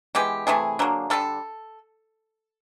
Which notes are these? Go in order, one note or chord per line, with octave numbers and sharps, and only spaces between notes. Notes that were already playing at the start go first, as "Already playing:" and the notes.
E3 G#3 B3 G4
C3 E3 A3 G#4
D3 F#3 A#3
D3 G3 A#3 A4